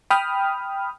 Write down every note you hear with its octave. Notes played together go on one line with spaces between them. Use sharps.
G5 B5 D#6 F6